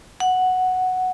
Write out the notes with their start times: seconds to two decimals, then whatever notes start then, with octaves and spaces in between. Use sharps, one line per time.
0.20 F#5